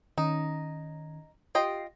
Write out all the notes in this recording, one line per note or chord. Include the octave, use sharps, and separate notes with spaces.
D#3 C#4 D#4
F4 G4 D#5 G5 C7